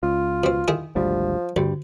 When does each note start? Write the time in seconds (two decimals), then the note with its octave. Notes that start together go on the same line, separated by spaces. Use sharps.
0.03 C#2 F4
0.44 B2 C4
0.68 D#3 E4 G#4
0.95 G#1 D2 F3 G3
1.56 D2 G2 G3